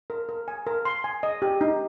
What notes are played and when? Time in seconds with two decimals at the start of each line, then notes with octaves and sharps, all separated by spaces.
0.10 A#4
0.29 A#4
0.48 G#5
0.66 A#4
0.85 C6
1.04 G#5
1.23 D#5
1.42 G4
1.61 D#4